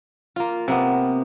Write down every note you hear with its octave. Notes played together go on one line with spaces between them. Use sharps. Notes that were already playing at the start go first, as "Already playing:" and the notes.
A#3 F4
C3 A#3 B3